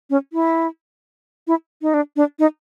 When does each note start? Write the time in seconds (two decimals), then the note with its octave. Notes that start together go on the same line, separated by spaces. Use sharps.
0.10 C#4
0.33 E4
1.47 E4
1.82 D#4
1.94 D4
2.16 D4
2.39 D#4